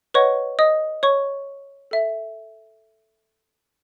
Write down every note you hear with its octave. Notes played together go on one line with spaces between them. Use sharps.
B4 C#5 D#5 F#5 C#6
D#5 D#6
C#5 C#6
A4 E5